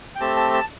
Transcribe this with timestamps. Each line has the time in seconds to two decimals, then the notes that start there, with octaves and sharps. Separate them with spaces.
0.15 G5
0.20 A3 C4 G4 A5
0.36 A5
0.53 A5